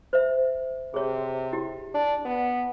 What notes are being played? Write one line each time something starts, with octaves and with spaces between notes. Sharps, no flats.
C5 E5
C3 G#4 C#5
E4 G4
D4
B3